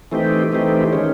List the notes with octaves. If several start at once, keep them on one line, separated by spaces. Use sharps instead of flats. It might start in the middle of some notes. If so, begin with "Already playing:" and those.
E3 A3 C4 D#4 G4
E3 A3 C4 D#4 G4
D#3 G#3 C#4